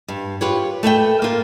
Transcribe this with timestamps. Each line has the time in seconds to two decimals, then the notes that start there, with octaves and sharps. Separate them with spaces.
0.08 G2
0.41 F4 G4 B4 C#5
0.83 A3 B4 E5 G5
1.22 A#3 F4